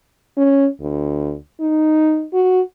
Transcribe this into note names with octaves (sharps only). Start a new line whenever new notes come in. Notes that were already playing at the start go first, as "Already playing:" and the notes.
C#4
D2
D#4
F#4